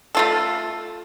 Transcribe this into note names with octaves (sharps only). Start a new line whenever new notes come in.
A3 F4 A4